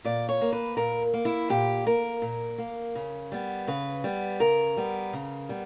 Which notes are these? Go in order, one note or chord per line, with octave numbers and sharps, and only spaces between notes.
A#2 D5
C#5
A#3
B4
A#2 A#4
A#3
E4
A#2 G4
A#3 A#4
A#2
A#3
C#3
G3 B3
C#3 B4
G3 B3
C#3 A#4
G3 B3
C#3
G3 B3